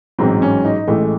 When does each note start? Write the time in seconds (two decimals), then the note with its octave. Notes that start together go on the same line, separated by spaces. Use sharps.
0.19 A1 G#2 F#3 C4
0.42 C#4
0.65 D#4
0.87 A1 A2 E3 G#3 A3